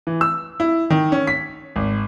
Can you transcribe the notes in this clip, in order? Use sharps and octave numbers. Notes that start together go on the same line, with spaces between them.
E3
E6
E4
D#3
C#4
B6
G#1